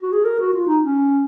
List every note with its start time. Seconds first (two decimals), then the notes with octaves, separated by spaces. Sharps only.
0.03 F#4
0.13 G#4
0.25 A#4
0.39 F#4
0.54 F4
0.67 D#4
0.83 C#4